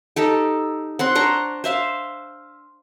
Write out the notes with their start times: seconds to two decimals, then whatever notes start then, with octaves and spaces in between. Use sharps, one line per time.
0.16 D#4 G4 A4
0.99 C4 F#5 C6
1.15 D4 C5 A#5 C#6
1.64 C5 E5 F5 C6